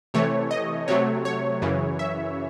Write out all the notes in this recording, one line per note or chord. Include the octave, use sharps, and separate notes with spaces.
C3 E3 A3 C#5
D#5
C3 F#3 A3 C#5
C#5
F#2 C#3 E3
E5